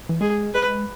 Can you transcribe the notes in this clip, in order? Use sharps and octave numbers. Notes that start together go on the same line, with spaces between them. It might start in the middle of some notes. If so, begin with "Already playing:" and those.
E3
G#3 G#4
G#3 B4